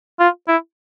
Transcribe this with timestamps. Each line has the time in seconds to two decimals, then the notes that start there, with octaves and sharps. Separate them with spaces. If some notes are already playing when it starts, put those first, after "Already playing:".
0.20 F4
0.48 E4